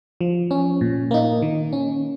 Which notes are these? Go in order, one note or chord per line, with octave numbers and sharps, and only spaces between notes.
F3
C#4
A#2
A#3 D#4
D#3
C#4